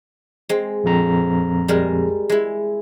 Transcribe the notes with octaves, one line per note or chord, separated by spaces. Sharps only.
G#3 C4
A#1 F2 A#5
G3 G#3 A#4
G#3 E4